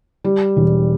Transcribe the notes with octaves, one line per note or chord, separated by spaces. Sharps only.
G3
E1